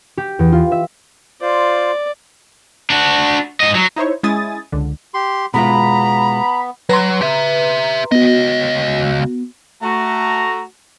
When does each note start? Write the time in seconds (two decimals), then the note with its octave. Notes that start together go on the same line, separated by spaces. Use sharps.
0.17 G4
0.39 E2
0.52 F4
0.72 E5
1.42 F4 C5 D5
2.90 D4 F#4
3.60 G#2 D#5
3.75 F#3
3.96 D#4 E4 C5 C#5
4.23 G#3 C#4 E4 G#5 D#6 A6
4.72 C#2 D3
5.14 G4 C6
5.54 B2 G#3 B3 F4 A#5 B5
6.89 F#3 B4 A#5 C6
7.21 G4 E5
8.12 C#2 B3 F#4 D#5
9.82 A3 F#4 A#5